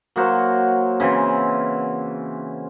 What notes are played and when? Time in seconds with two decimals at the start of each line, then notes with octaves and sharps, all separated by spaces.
0.16 F#3 A#3 F#4 C5
1.00 C#3 E3 C4